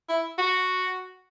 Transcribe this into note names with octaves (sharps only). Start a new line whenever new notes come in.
E4
F#4